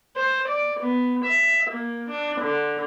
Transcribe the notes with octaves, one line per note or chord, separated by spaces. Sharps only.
C5
D5
B3
E5
A#3
D4
D3